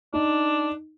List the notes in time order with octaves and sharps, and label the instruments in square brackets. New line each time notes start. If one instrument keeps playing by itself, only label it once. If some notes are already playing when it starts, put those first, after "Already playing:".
[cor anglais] D4 [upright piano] D#4